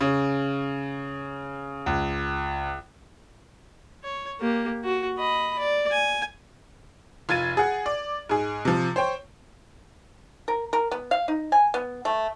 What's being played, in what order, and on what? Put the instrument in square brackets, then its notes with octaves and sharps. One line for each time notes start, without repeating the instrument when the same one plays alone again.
[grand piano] C#3
C#2
[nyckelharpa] C#5
A#3 G4
F#4
D#5 B5
D5
G#5
[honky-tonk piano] F1 F4 G#6 A6 D#7
G#4 F#5
D5
G#2 G#4
C3 F3
C5 C#5 G5
[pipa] A#4
A#4
B3
F5
D#4
G#5
B3
A3